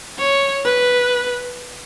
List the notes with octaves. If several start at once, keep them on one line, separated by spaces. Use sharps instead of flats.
C#5
B4